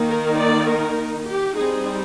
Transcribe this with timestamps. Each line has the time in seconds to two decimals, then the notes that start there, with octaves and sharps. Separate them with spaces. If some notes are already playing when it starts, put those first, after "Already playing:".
Already playing: D#3 A#3 D#4
0.11 A#4
0.40 D5
0.69 A#4
1.28 G4
1.56 G3 C4 D#4 G#4